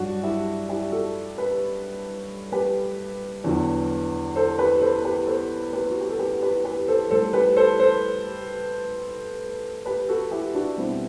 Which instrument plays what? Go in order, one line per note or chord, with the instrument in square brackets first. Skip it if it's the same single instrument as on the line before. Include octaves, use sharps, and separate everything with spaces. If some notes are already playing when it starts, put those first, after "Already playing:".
Already playing: [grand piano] G2 F#3 D4 F#4
E4 G4
E4 G4
F#4 A4
G4 B4
G4 B4
E2 D3 F#3
A4 C5
G4 B4
A4 C5
G4 B4
A4 C5
G4 B4
F#4
G4
A4
G4 B4
G4 B4
G4 B4
A4 C5
A2 G3 A4 C5
G4 B4
A4 C5
A4 C5
G4 B4
F#4 A4
E4 G4
D4 F#4
B2 G3 C4 E4